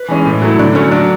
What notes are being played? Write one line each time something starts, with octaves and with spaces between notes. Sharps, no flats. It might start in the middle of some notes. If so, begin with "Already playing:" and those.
Already playing: B4
E3 G#3 C#4 G#4
A2
F#3 A3 E4
D3 D4
F#3 A3 C#4
F#3 D4